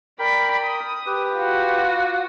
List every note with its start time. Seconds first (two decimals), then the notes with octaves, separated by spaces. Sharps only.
0.19 A#4 D5 G5 B5
0.64 D#6
1.06 G4 B4
1.36 F4 F#4